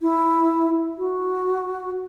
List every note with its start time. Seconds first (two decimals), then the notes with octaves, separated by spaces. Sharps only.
0.01 E4
0.98 F#4